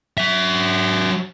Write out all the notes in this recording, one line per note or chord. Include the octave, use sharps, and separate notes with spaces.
F#3 E5